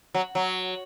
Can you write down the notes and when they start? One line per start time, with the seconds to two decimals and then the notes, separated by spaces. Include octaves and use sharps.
0.14 F#3
0.35 F#3